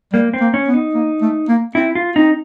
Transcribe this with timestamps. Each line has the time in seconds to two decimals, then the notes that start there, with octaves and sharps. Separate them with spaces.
0.13 G3 A#3
0.34 C4
0.40 A#3
0.54 C#4
0.68 B3
0.74 D#4
0.94 A#3
1.22 A3
1.49 A#3
1.75 C4 E4
1.95 F4
2.16 C4 D#4